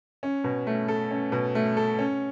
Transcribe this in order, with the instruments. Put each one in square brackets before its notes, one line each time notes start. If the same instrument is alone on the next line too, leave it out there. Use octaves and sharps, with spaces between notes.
[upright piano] C#4
B2
A3
A4
C#4
B2
A3
A4
C#4